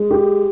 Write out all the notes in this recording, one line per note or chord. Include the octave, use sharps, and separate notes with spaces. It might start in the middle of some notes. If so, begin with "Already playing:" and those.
Already playing: G#3
G4